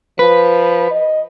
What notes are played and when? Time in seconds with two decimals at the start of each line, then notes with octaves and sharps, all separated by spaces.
0.19 F3 B4
0.91 D#5